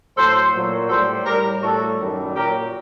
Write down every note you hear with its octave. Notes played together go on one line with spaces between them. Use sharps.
A2 F#3 A4 C5
A#2 F#3
A2 G3 A4 C5
A2 G3 G4 A#4
A2 G3 F#4 A4
F#2 D#3 G3
A#2 F#3 G4 A#4